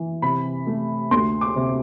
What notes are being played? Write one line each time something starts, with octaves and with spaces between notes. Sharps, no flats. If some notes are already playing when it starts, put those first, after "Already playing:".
Already playing: E3
C3 B5
A3
D2 C6
D6
C3